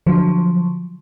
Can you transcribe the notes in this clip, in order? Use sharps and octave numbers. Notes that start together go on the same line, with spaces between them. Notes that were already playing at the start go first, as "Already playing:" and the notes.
D3 F3 F#3